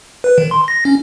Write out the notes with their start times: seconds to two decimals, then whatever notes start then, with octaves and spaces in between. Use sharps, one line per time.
0.24 B4
0.38 D#3
0.51 C6
0.68 A#6
0.85 C#4